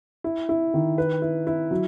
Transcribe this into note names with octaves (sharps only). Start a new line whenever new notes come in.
E4
E4
D#3
B4
E4
E4
F#3